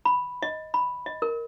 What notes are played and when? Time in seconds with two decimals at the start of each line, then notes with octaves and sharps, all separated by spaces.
0.05 B5
0.43 D#5
0.74 B5
1.06 D#5
1.22 A#4